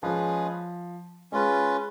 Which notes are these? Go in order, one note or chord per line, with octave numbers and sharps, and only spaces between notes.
F3 G#3 C#4 G#4 B4
G#3 C#4 F4 B4